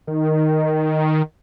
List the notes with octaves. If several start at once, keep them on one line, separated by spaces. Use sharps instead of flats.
D#3